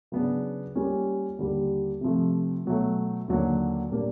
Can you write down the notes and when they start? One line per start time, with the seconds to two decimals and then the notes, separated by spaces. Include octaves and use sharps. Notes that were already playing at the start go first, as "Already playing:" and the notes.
0.12 C#3 F#3 B3 D4
0.75 G3 A#3 C#4 F4
1.39 D#2 D3 G3
2.01 C3 F3 A3
2.65 B2 F#3 A3
3.28 D#2 D3 F#3 A#3
3.91 A#2 G3 A#3 D4